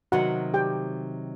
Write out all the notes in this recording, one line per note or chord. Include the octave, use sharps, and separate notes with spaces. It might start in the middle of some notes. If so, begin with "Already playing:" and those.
C3 D#3 F#3 F#4 F#5
G4 G5